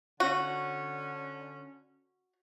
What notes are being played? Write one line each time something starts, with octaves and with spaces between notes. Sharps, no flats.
D3 C#4 F#4